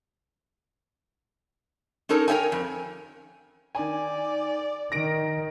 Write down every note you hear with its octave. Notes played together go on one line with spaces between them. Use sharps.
C#4 D#4 A4 A#4 C#5
A#4 C#5 E5 G5 G#5
F2
D#3 D5 G#5
D#3 A#6 D7